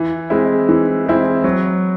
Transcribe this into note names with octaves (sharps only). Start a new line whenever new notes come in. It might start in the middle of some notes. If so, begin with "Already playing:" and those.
Already playing: E3
G#3 C4 E4
E3
G#3 C4 E4
F#3